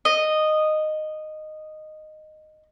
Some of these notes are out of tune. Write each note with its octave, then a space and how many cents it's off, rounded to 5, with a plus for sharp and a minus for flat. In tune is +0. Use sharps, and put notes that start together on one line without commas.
D#5 -10